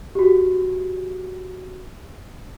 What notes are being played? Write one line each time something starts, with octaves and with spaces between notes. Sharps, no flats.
F#4 G4